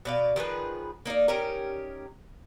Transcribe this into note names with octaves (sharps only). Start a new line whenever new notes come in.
B2 D5 F5
D#3 F3 G#4 B4
A#3 D#4 F#4 D5
D#3 C#4 G4 A#4